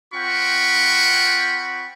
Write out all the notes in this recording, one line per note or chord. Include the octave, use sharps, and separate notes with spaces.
C4 F4 F#5 G5 B5 C#6